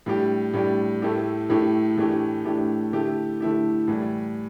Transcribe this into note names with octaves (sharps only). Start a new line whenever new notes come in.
A2 G3 D4 G4
A2 G3 D4 G4
A2 A3 E4 G4
A2 A3 E4 G4
A2 E3 A3 D4 G4
A2 E3 A3 D4 G4
D3 A3 E4 G4
D3 A3 E4 G4
A2 E3 G3